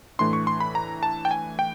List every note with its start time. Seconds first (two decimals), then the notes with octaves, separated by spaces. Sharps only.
0.19 A2 E3 A3 D4 C6
0.33 C#6
0.47 C6
0.60 B5
0.75 A#5
1.03 A5
1.25 G5
1.31 G#5
1.59 G5